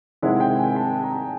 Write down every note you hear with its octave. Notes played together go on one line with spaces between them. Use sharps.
C3 D#3 G#3 C4 E4 F#5
G5
G#5
A5
A#5